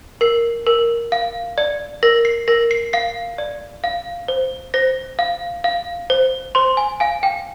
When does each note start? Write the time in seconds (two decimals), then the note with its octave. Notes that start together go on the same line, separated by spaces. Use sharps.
0.21 A#4 C7
0.66 A#4
1.12 F5
1.58 D5
2.03 A#4 A#6
2.25 C7
2.48 A#4 A#6
2.71 C7
2.93 F5 C7
3.38 D5
3.84 F5
4.28 C5
4.74 C5 A#6
5.19 F5
5.64 F5
6.10 C5
6.55 C5 C6
6.77 G#5
7.00 F5 G#5
7.23 G5